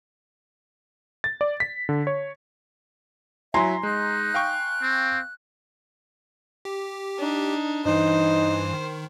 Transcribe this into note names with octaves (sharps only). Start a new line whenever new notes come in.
A6
D5
B6
D3
C#5
F#3 E4 E5 G#5 A#5 C6
G#3 D#4 F#6
F5 G5 C#6
C4
G4
D4 D#4
G2 E3 D#4 C5
D#3